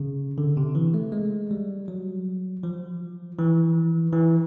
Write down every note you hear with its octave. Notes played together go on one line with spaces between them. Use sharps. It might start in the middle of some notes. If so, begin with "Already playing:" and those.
Already playing: C#3
D3
C3
E3
A3
G#3
G3
F#3
F3
E3
E3